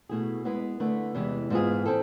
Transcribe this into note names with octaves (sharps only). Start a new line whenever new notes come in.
B2 A3 E4 G#4
G#3 B3 E4 B4
D3 A3 E4 B4
E2 C3 E3 G#3
G#2 E3 B3 F4 G#4
C4 E4 A4